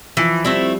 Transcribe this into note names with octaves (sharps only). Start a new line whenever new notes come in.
E3 F3
G3 A3 C4 E4